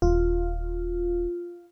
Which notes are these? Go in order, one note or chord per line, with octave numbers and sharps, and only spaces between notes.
D#1 F4